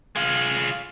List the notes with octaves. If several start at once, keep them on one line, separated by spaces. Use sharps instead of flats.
G#3 F4